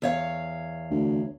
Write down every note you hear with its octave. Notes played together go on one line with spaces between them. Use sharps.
E2 C#5 F5
D2